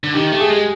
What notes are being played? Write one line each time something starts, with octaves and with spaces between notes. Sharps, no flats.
D3
D#3 G4
A3 G4
G#4
G#3